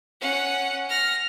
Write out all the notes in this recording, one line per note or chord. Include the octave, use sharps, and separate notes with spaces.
C#4 F#5
F6 A#6